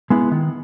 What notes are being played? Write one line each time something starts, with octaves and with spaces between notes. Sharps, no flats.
G#3 B3 E4
D#3